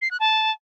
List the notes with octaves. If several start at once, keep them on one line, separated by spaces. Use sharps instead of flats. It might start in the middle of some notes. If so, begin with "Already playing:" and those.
C7
F#6
A5